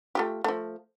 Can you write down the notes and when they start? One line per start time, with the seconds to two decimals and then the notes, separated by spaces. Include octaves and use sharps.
0.15 A3 F4 G4
0.44 F3 A3